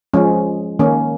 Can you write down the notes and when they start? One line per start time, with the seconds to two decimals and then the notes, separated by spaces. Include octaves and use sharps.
0.14 F3 G#3 C#4
0.79 D#3 A#3 C#4